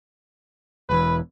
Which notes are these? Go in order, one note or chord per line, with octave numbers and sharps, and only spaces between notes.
E1 E3 B4